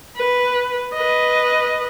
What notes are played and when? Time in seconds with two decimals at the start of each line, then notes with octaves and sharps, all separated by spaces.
0.16 B4
0.93 B4 D#5